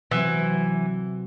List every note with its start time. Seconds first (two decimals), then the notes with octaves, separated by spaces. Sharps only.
0.11 C3 E3 F#3 C4